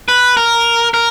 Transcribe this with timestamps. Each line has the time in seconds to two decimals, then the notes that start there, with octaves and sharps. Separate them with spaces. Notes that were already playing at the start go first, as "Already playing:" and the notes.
0.08 B4
0.37 A#4
0.94 A#4